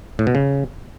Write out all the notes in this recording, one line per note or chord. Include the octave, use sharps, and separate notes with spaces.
A2
B2
C#3